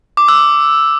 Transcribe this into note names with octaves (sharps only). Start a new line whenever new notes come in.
D6
E6